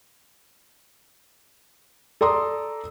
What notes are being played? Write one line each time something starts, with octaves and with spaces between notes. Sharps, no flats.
A4 D5 A#5 C6 D#6